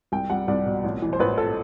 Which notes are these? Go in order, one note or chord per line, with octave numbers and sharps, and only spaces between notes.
C2 G5
G3 F#5
C2 D5
B2
A1
E3
C5
A1 B4
A4